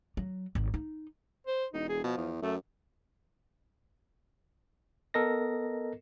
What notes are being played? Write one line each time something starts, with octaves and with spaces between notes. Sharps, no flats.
F#3
G#1
D#4
C5
E1 D#4
G#4
B2 F3
E2
F#2 A3
B3 A4 A#4 D#5 A#6